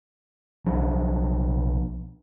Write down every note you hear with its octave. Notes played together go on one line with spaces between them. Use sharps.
B1 F3